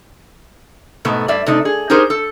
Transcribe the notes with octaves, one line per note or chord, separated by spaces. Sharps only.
G#2 B2 A3 B3
G2 D5 E5
C3 A3 D4 D#4
G#4
D#4 G4 G#4 A#4 C5
A4